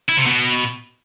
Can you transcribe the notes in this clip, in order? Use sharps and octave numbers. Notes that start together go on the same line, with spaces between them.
E4
C3
B2